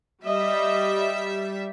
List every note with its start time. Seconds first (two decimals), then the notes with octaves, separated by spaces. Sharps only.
0.25 G3 D#5 E5